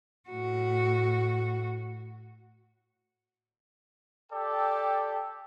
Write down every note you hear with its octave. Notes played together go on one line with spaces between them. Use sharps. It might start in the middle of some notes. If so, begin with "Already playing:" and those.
A2 F#4
G4 A4 D5 G5